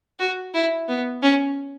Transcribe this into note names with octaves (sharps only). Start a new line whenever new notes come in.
F#4
E4
B3
C#4